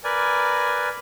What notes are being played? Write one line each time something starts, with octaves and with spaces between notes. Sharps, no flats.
A#4 B4 D5 G#5